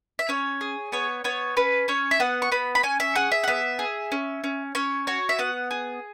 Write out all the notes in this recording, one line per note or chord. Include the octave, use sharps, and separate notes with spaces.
E5
C#4 C#5
G#4
B3 C#5
B3 C#5
C#4 B4
C#4 C#5
E5
B3 F#5
C#6
B3 B5
B5
C#4 G#5
E5
G#4 F#5
E5
F#5
B3 E5
G#4
C#4
C#4
C#4 C#5
F#4 C#5
E5
B3 F#5
G#4